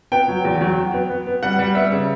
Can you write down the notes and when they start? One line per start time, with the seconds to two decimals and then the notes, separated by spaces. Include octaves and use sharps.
0.12 B3 G5
0.28 F#3
0.45 E2
0.61 F#3
0.78 F#3
0.94 B3
1.09 B3
1.27 B3
1.43 G3 F#5
1.59 G3
1.75 B3 E5
1.92 C#3